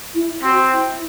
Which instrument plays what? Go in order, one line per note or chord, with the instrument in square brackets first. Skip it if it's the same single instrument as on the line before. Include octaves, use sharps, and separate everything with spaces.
[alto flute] E4
[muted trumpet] C4 [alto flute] F#4
[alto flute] E4